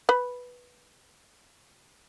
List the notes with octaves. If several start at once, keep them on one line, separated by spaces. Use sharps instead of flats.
B4 B5